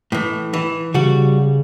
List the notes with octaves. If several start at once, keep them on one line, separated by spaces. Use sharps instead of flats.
A2 E3
E3
C#3 G3 F#4